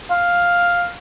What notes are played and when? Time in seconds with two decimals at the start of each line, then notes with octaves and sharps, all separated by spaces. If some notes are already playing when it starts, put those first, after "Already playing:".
0.11 F5